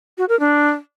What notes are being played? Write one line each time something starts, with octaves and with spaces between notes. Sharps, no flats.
F#4
A#4
D4